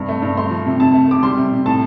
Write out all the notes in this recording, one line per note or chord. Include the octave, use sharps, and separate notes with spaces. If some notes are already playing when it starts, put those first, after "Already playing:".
Already playing: G2 C3
A3
G2
A3 C6
F3
C3
F2 A5
A3
A3 D6
G3 C6
C3
C3
A2 A5